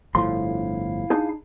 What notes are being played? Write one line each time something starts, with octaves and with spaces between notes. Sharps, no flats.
G1 A2 F3 E4 F5 C6
D4 D#4 G#4